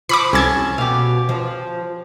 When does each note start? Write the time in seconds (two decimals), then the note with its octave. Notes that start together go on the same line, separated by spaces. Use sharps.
0.09 F3 B5 C#6 D6
0.33 C2 C#4 A4 A5 G#6
0.78 B2 G4 F5
1.29 F3